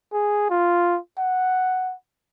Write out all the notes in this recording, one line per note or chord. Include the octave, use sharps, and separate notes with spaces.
G#4
F4
F#5